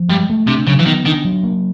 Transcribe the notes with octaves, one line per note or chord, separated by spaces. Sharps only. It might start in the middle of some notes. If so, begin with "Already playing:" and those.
Already playing: F3
G2 G#3
A3
C3 D4
C#3 F#3
E3
D#3 B3
D#3 D4
F#3
A#3